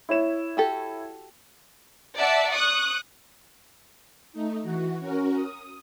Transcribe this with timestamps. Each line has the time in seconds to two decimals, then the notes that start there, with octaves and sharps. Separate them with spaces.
0.09 E4 C#5 E7
0.57 F#4 G4 A4
2.18 D5 E5 F#5 A5
2.51 C#6 D#6 F#6
4.33 A3 D#4
4.63 E3 F#4
5.00 C#4 F#4 A#4
5.35 D#6